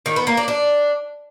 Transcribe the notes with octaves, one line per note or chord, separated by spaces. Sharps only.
D#3
B3
A#3
D4
D4